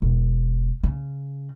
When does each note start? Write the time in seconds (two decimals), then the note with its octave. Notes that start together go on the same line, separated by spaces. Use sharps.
0.02 E1
0.83 C#3